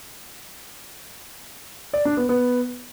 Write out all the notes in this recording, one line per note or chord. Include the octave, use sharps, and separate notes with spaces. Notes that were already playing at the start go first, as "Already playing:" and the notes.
D5
D4
B3
B3